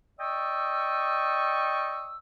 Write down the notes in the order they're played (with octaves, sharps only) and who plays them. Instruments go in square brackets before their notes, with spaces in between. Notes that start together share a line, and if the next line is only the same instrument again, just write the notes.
[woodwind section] D5 D#5 G5 C#6 D#6 E6